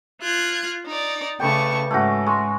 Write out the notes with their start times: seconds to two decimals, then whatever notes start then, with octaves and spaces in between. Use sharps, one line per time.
0.20 F4 F#6 G#6
0.86 D#4 D5
1.40 C#3 A3 B4 D5 G5 C#6
1.91 G#2 A3 C#4 F#4
2.26 G#3 C#6